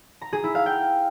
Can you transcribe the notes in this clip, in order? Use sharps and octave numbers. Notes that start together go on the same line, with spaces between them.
A#5
G#4
E4
F5
G5